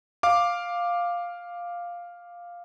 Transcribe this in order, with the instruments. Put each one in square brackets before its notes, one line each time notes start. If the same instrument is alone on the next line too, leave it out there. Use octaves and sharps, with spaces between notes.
[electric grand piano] F5 D6